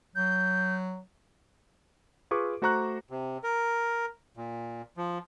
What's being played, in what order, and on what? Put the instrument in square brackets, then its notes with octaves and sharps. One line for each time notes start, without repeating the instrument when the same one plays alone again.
[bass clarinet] F#3 [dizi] G6
[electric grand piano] F4 G#4 B4 C#6 D6
A3 F#4 C5 A#5 C#6 F#6
[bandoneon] C3
A#4
A#2
F3